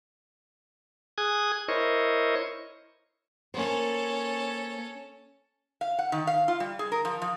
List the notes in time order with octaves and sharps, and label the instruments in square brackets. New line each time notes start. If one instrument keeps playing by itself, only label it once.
[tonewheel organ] G#4 G#5 D#6 F#6 G#6
E4 A#4 C5 C#5 D#5 C#6
[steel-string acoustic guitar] A#3 C5 [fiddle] C#4 A4
[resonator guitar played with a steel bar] F5
F#5
D#3
F5
F4
G3
G#4
A#4
F3
F3